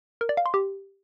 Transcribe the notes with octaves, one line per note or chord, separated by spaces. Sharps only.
A#4
D5
F5
C6
G4